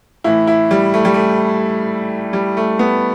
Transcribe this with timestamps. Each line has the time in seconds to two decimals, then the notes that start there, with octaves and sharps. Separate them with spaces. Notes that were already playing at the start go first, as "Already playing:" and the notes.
0.24 A2 E3 E4
0.47 E4
0.71 G3
0.94 A3
1.05 G3
1.14 A3
2.33 G3
2.57 A3
2.79 B3